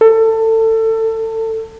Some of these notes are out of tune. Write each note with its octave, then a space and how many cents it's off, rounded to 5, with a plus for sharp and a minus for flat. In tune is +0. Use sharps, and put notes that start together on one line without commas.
A4 +25